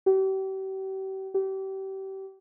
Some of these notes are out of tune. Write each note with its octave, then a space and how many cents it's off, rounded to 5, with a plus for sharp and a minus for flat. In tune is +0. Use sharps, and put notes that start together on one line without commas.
G4 -40
G4 -30